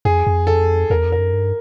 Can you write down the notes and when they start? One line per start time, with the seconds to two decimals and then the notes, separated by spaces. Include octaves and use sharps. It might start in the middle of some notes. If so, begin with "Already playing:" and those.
0.05 F2 G#4
0.27 F2
0.47 A4
0.90 E2 A#4
1.05 F2
1.12 A#4
1.18 F#2
1.33 G2